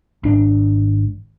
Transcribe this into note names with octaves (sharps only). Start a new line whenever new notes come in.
G#1 D4